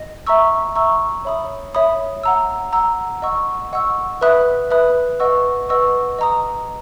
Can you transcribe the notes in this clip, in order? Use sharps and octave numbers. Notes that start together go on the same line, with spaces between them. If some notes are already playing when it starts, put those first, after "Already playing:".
Already playing: D#5
E5 A#5 C#6 E6
E5 A#5 C#6 E6
C#5 E5 B5 D#6
C#5 E5 B5 D#6
F#5 A#5 E6
F#5 A#5 E6
D#5 F#5 C#6 E6
D#5 F#5 C#6 E6
B4 E5 B5 D#6 F#6
B4 E5 B5 D#6 F#6
B4 D#5 F#5 C#6 E6
B4 D#5 F#5 C#6 E6
D#5 A#5 D#6